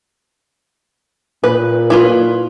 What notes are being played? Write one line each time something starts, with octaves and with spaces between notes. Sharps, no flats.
A#2 B4
E4 F4 B4